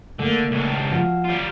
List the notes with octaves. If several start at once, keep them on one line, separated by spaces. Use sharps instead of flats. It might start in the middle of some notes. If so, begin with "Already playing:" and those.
D3 A3 A#3
C#2 D4
F3 F#4
G3 F4